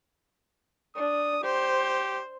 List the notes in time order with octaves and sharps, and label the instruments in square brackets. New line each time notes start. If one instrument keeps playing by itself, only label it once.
[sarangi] D4 [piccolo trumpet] D#6
[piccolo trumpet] G4 [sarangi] C5